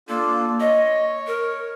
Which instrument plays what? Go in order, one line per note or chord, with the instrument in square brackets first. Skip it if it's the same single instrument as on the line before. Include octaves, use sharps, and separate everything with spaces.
[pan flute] A#3 [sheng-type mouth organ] D4 F4 A4
[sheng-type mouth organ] C#5 [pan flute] D#5
[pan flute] A#4